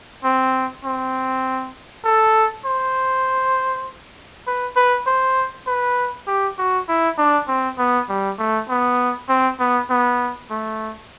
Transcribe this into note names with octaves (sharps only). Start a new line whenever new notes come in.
C4
C4
A4
C5
B4
B4
C5
B4
G4
F#4
E4
D4
C4
B3
G3
A3
B3
C4
B3
B3
A3